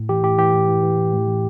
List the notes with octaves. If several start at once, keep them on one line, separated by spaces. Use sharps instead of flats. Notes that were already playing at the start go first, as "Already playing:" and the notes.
Already playing: A2
E3 G4
A2 G4
E3 G4
A2
E3
E3
A2
A2
E3